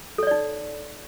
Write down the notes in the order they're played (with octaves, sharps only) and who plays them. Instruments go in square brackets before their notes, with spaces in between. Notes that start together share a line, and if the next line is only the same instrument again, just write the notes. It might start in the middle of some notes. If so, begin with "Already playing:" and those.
[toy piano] A4
C#5
D5
D#4